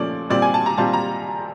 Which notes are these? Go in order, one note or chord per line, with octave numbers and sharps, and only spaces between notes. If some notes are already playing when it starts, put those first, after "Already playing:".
Already playing: A#2 F3 A3 C#4 D5
A#2 G3 C4 F4 D5
G#5
A5
A#5
A#2 G3 C4 F4 A5
A#5